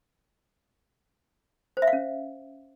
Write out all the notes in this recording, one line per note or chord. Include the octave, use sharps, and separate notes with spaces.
C5
E5
F5
C#4